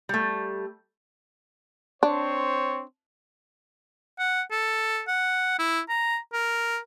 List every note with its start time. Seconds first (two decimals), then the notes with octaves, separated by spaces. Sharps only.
0.09 G3 A3
2.03 C4 D4 C5 C#5
4.19 F#5
4.51 A4
5.08 F#5
5.59 E4
5.89 A#5
6.33 A#4